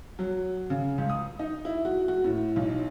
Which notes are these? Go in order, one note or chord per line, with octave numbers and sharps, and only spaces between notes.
F#3
C#3
C#2
D#6
D#4
E4
F#4
F#4
A2
B1